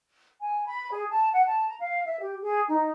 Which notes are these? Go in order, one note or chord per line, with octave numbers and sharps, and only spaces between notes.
G#5
B5
G#4
A5
F#5
A5
A#5
F5
E5
G4
G#4
D#4